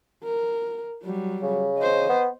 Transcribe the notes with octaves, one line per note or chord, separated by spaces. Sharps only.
A#4
F#3 G3
C#3
C5 D#5
B3